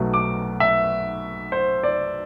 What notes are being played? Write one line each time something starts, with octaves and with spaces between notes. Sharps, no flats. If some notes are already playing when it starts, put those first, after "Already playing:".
Already playing: B1 B2 F#3 A3
D6
E5
C5
D5